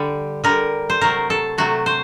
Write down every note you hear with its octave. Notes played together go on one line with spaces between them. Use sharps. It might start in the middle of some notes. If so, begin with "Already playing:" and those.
Already playing: D3 G3
D3 G3 A#4
C5
C3 F#3 A3 A#4
A4
C3 F#3 A3 F#4
C5